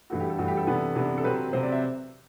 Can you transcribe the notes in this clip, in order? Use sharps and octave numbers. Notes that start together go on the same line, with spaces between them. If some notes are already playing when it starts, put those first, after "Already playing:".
G2 E3 A3 F#4
G4
A4
G2 E3 A3 F#4
G4
A4
C3 E3 B3 D4
C3 E3 B3 D4
A4
C3 F#3 C4 B4
C3 F#3 C4 C5
D5
E5